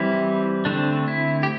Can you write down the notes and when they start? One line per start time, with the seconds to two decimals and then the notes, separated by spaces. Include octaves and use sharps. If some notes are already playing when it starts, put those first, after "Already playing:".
Already playing: E3 G3 C4 E4
0.65 D3 A3 C4 D4
1.08 E4
1.43 G4